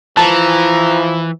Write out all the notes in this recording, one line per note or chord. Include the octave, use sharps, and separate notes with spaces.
E3 F3 A5 A#5